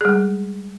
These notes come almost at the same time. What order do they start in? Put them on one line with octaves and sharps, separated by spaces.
G#4 G3 G#3